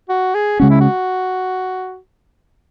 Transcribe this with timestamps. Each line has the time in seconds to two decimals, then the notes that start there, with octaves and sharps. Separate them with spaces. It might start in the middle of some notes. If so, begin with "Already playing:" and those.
0.09 F#4
0.35 G#4
0.60 C#3 G#3 C#4 F#4
0.70 E4
0.81 F#4